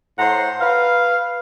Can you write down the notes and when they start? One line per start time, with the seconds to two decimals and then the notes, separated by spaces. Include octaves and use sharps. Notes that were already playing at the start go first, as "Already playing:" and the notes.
0.19 A2 C5 F#5 A#5 C6
0.61 B4 F5